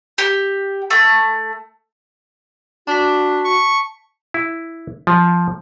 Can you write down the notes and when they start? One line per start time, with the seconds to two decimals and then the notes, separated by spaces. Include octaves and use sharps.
0.18 G4
0.90 A3
2.87 D4 F#4 A5 B6
3.45 C#6
4.34 E4
5.07 F3